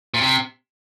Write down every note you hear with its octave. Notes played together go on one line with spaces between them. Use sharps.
A#2
C3